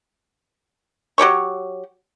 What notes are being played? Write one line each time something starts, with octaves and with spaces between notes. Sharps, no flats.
F#3 G4 C#5 C#6